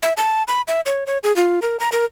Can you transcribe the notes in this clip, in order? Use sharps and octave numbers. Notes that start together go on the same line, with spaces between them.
E5
A5
B5
E5
C#5
C#5
G#4
F4
A#4
A#5
A#4